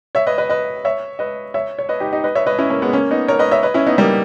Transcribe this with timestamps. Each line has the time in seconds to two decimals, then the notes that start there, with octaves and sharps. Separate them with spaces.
0.15 C#5 E5
0.27 B4 D#5
0.38 B4 D#5
0.49 B4 D#5
0.85 C#5 E5
1.19 B4 D#5
1.54 C#5 E5
1.79 C#5
1.89 B4 D#5
2.00 D#4 G4
2.12 D#4 G4
2.24 B4 D#5
2.35 C#5 E5
2.47 B4 D#5
2.58 C#4 E4
2.70 A#3 C#4
2.82 G#3 B3
2.93 A#3 C#4
3.11 B3 D#4
3.28 A#4 C#5
3.39 B4 D#5
3.51 C#5 E5
3.63 B4 D#5
3.74 C#4 E4
3.87 B3 D#4
3.98 G3 A#3